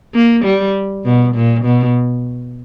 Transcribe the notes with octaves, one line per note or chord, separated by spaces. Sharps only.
A#3
G3
B2
A#2
B2